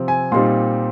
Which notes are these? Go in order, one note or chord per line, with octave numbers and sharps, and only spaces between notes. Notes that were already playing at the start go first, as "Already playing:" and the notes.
Already playing: C3 F3 C4
G#5
A#2 G3 C4 D#4 C6